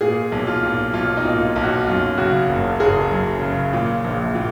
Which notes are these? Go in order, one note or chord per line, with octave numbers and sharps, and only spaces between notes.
A#2 G#4
B1
F4
A#2
B1 F4
D#4
A#2
F4
B1
F#4
F#2 F4
C#3 F#4
F#1
F#1 G#4
F#2
C#3
A#2
A#1
A#2